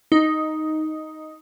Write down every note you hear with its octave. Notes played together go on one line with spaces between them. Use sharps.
D#4